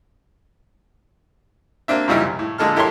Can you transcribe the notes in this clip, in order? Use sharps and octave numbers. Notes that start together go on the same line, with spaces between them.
A#3 C4 D4 E5
F#2 A#2 C#3 G3 D#4 E4
C2
A2
A#2 D3 G#3 A4 A5 F6
E4 G4 A4 A#4 C#5 C6